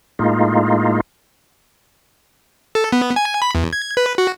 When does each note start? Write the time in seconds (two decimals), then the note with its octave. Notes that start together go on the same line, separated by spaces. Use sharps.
0.19 A2 G#3 A#3 D#4 F4
2.75 A4
2.92 B3
3.16 G#5
3.42 B5
3.55 E2
3.73 G#6
3.97 B4
4.18 F#4